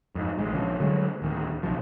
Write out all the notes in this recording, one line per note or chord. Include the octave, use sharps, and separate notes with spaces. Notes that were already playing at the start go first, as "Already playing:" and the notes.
F2 G#2
A1 G#3
A#1 C#3 F3
D3 F#3 G#3
D1 D#3
B1 C3 F3